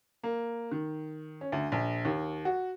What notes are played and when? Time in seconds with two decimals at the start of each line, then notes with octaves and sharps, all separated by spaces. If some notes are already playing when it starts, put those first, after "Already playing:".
0.23 A#3
0.71 D#3
1.41 C#4
1.52 D2
1.72 A#1
2.05 D#2
2.45 F#4